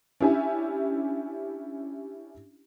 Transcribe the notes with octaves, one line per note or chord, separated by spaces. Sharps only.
C#4 D4 E4 G4 E5 G#5